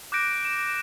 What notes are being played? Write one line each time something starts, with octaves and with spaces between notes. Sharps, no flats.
D6 F#6 G6 A#6 D7
E7